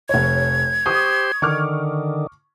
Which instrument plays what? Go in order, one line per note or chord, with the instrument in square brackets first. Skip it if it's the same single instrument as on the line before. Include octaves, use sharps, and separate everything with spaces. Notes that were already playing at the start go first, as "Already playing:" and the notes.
[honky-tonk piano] F1 C#5 [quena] G#6
[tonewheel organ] G4 C5 [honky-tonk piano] C#6 D#6
[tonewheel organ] D3 D#3 [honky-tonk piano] C#6 D6 F6